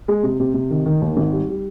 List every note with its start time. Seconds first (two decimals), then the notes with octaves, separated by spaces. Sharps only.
0.08 G#3
0.23 C3
0.40 C3
0.54 C3
0.70 D#3
0.86 D#3
1.01 D#2
1.17 G#1
1.33 G3
1.49 G3